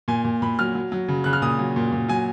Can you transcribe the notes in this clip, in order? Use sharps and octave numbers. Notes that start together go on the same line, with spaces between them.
A#2 G#5
A#2
A#2 B5
F#3 F6
F#3
F#3
C#3
C#3 F#6
F6
A#2 D#6
F#3
A#2
A#2
F#3 G#5